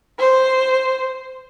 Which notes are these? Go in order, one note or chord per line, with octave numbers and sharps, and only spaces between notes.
C5